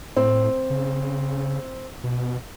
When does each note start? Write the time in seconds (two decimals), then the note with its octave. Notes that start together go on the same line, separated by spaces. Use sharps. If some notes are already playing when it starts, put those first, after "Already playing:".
0.16 A2 C4
0.70 C#3
2.04 B2